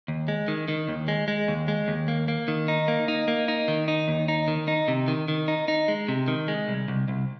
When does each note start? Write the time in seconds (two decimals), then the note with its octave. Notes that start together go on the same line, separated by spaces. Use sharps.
0.08 D#2
0.28 G#3
0.48 D#3
0.68 D#3
0.88 D#2
1.08 G#3
1.28 G#3
1.48 D#2
1.68 G#3
1.88 D#2
2.08 A#3
2.28 A#3
2.48 D#3
2.68 D#4
2.88 A#3
3.08 D#4
3.28 A#3
3.48 D#4
3.68 D#3
3.88 D#4
4.08 D#2
4.28 D#4
4.48 D#3
4.68 D#4
4.88 C3
5.08 D#3
5.28 D#3
5.48 D#4
5.68 D#4
5.88 G#3
6.08 C3
6.28 D#3
6.48 G#3
6.68 C2
6.88 C2
7.08 C2